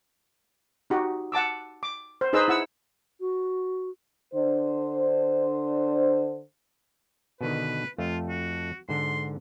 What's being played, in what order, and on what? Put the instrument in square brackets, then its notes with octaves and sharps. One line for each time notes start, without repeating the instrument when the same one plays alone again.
[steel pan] D#4 F#4 G4
F#5 A5 D6 E6
D6
C5
D#4 G#4 B4 C5 D#5 E6
E4 F#5 E6
[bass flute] F#4
[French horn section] D3 D4 C5
[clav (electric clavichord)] B2 D3 D#3 [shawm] B4
[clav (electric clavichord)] F2 A3 [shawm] F4
[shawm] F#4
[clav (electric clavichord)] G#2 D3 [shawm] C6